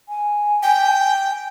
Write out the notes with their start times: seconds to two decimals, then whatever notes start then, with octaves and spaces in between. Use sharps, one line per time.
0.09 G#5
0.63 G5